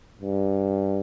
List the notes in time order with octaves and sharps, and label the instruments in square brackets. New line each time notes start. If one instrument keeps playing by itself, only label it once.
[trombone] G2